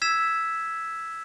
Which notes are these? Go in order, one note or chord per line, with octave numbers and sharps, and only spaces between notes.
E6 G#6 B6 E7